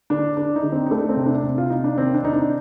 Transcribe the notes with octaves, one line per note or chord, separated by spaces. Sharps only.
D3 D4
D3 D4
D#4
D3
C4
D#4
A3 D4
C4
C3
D4
C3
F4
C3 D#4
D4
D#3 C4
D4
C3 D#4
D4